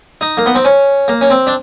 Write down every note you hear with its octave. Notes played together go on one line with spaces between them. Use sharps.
D#4
A#3
B3
C4
C#4
A#3
C#4
C4
D4